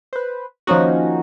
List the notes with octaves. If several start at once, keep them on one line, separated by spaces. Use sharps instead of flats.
B4 C5
D#3 F3 A#3 C#4 D#4 F#4